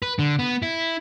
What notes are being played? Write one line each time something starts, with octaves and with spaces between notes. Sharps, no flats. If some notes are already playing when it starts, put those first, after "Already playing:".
B4
D3
B3
E4